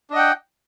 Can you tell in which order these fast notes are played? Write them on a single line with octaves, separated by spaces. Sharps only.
D4 D#5 F#5 G5